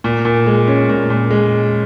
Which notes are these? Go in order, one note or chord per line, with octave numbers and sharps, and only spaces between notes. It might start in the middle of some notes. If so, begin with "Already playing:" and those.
A#2
A#2
G#3
C#4
A#2
A#2
G#3